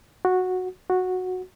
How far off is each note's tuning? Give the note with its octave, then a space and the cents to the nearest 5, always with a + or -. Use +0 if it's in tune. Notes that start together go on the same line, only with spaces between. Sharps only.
F#4 -10
F#4 -10